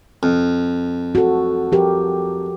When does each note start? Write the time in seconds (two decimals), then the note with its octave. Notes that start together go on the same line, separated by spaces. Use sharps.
0.23 F2
1.15 F#4 A4
1.72 F3 G4 A#4